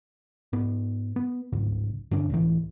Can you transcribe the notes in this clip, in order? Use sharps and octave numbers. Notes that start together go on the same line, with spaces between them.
G#2 B3
B3
D1 G#1 C#2 G#2
G2 D3 C#4 D4
C#2 A2 E3